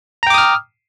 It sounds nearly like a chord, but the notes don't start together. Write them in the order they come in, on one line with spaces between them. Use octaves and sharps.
A#5 G5 D6 D#6 F6